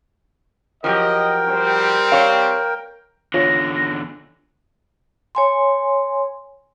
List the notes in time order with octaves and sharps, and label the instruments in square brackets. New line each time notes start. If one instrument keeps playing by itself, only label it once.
[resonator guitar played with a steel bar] F3 F#3 G4 [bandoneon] A#4 G5 [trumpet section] D#5
[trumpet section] G3 C4
[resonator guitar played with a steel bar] C#5 F5
[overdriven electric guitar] E2 D3 [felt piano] F4 C#5 [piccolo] A#6
[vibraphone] C#5 G#5 C6